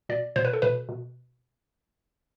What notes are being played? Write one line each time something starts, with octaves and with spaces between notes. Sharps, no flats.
B2 D5
B2 C5
B4
A4
B2 B4
B2